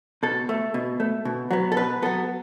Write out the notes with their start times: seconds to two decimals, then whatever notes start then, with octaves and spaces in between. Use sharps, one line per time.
0.23 B2 A4
0.49 A3
0.74 B2
1.00 A3
1.25 B2
1.51 F#3 B3
1.72 A4
1.77 B2 B4
2.02 F#3 B3 A4